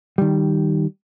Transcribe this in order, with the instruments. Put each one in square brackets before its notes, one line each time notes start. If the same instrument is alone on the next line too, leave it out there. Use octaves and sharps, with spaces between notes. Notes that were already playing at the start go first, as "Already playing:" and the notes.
[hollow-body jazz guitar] D#3 G3